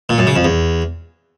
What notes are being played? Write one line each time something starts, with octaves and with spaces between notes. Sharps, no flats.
A#2
F#2
C#3
F2
E2